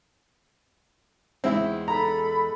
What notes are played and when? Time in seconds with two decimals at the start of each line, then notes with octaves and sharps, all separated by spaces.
1.44 E2 G#3 C4 E4
1.88 A4 A#5 B5